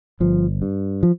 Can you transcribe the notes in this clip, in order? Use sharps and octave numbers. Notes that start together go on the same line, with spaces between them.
G1 F3
G2
F3